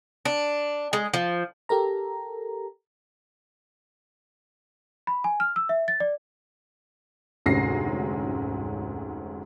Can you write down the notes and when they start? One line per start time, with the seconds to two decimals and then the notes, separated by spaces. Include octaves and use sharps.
0.25 D4
0.93 G#3
1.14 F3
1.69 G4 A4 A#4 A#5
5.07 B5
5.24 G#5
5.40 F6
5.56 E6
5.69 E5
5.88 A6
6.00 D5
7.46 F1 D2 G#2 C#4 A#6 C7